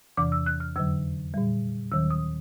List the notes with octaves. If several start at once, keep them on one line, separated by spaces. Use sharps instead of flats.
E2 C3 E3 D6
E6
F#6
F6
F2 D3 F#3 E6
A#2 G3
D#2 D#3 F#3 E6
D#6